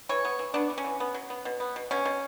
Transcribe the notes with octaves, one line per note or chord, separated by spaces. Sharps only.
E3 C#5
B3
E3
B3 D4
E3
C#4
E3
B3
F#3
B3
B2
B3
B2
B2 C#4
B2